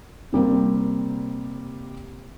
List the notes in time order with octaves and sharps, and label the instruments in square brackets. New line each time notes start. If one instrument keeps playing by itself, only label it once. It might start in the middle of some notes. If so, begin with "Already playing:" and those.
[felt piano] C3 G3 A#3 C4